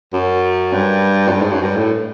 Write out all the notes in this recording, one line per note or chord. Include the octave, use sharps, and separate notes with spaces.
F#2
G2
F#2
G2
G#2
F#2
G2
A2